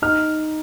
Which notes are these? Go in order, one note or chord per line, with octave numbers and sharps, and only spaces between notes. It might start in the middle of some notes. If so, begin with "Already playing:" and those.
D#4 F6